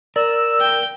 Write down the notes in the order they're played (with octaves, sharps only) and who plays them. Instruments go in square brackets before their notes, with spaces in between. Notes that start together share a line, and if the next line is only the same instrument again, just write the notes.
[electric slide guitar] A#4 [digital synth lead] D5 [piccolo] E6
[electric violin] G5